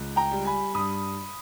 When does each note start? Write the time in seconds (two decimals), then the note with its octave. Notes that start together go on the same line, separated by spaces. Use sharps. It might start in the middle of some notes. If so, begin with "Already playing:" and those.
Already playing: C#2
0.16 G5 A#5
0.31 G3
0.45 G#5 B5
0.74 G2 B5 D#6